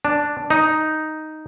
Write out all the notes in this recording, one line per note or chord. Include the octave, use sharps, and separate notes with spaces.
D4
D#4